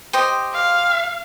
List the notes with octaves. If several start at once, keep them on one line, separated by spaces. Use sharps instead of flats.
G4 C5 D#5
F5